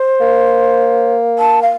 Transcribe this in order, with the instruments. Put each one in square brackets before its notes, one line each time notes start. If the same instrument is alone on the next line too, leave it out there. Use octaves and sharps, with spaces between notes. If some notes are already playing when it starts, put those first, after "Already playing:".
Already playing: [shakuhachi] C5
[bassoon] A#3
[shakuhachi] A5
F5